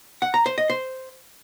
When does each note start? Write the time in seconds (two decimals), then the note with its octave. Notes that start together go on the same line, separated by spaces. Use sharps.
0.22 F#5
0.34 A#5
0.46 C5
0.58 D#5
0.70 C5